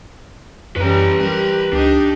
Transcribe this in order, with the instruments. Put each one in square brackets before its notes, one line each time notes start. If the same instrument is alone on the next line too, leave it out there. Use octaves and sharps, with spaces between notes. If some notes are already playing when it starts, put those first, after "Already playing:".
[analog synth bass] F#2 [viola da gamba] E3 G3 C#4 [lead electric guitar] B4 A#5
[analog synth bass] G3 [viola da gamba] G4 A#4
[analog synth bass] C#2 [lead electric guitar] D4 [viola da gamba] D#4 G4